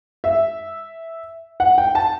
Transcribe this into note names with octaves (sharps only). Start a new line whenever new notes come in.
E5
F#5
G5
A5